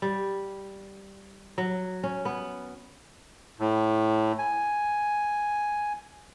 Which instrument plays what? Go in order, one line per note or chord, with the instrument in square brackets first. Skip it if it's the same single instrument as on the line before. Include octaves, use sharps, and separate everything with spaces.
[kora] G3
F#3
C#4
B3
[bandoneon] A2
G#5